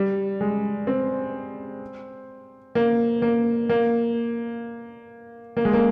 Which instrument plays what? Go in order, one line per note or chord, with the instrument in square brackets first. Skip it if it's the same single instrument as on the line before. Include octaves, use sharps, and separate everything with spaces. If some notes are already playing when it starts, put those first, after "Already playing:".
Already playing: [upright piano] G3
G#3
C4
A#3
A#3
A#3
A#3
G#3
A#3